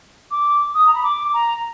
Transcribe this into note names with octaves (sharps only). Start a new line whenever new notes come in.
D6
D#6
A#5
B5
D6
A#5